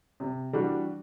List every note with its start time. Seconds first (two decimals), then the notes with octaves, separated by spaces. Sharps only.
0.20 C3
0.53 E3 G3 D4 F#4